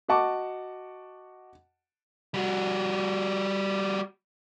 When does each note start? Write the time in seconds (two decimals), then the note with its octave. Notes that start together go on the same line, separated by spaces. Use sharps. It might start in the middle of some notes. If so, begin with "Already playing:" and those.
0.08 F#4 D#5 F#5 A5 C#6 D6
2.34 G3 F#4